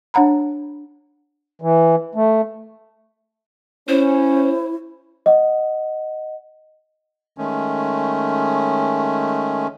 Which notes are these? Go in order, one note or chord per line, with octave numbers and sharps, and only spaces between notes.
D4 C#5 F#5 A#5 B5
E3
A3
C#4 E4 C5
D#5 F#5
D#3 G#3 A3 C#4